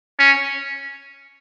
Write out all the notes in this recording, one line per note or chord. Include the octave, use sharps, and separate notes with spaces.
C#4